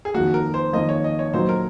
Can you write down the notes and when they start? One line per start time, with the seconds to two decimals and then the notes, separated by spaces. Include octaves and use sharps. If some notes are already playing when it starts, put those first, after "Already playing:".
0.05 G#4
0.14 F2 D#3 A#3 F#4
0.34 A#4
0.54 C5
0.73 F2 D#3 A#3 D#5
0.89 C#5
1.04 D#5
1.19 C#5
1.33 A#2 F#3 A#3 D#4 C5
1.49 A#4